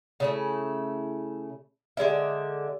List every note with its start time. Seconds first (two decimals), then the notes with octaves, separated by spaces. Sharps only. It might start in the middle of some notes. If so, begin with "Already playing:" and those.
0.20 C#3 A3 E4
1.97 D3 G#3 D5 E5